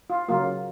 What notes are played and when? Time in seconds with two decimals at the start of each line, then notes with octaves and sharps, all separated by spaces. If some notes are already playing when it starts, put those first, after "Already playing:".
0.10 F4
0.28 C#3 F#3 A#3 F4